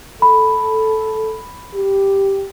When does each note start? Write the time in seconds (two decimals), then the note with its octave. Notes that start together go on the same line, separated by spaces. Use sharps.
0.22 A4 B5
1.75 G4